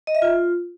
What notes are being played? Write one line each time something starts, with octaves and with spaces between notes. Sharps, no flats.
D#5
E5
F4